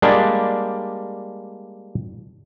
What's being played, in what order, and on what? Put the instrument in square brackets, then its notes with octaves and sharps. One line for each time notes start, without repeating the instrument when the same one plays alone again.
[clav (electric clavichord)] G3 G#3 A#3 D4